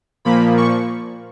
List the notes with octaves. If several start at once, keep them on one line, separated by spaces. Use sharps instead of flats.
A#2 F3 A#3 B5
C#6